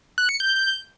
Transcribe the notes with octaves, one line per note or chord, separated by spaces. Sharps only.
F#6
C#7
G6